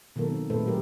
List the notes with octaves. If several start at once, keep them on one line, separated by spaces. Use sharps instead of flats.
B2 D#3 F#3 A#3 A4 A#4
C4
A#2 G#3 A3 A4 B4 C5
F#3 F4 G4 A#4